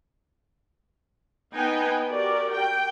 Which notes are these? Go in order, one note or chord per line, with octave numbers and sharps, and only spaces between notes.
B3 D#4 B4 G5 G#5
F#4 G4 A#4 D5
G5